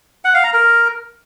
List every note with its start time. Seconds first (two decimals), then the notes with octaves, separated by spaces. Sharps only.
0.25 F#5
0.34 F5
0.44 A#5
0.53 A#4